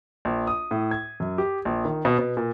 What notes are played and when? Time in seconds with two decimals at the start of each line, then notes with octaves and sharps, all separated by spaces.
0.25 A#1
0.47 D#6
0.71 A2
0.91 G#6
1.20 F#2
1.38 G4
1.65 A#1
1.85 D#3
2.05 B2
2.18 B2
2.37 A#2